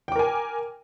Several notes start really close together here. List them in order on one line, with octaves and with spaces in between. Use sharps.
G5 D6 A#4 G#5